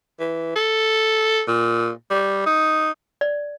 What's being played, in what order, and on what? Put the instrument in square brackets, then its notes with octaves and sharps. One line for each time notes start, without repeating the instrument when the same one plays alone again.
[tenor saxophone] E3
A4
A#2
G3
D#4
[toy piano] D5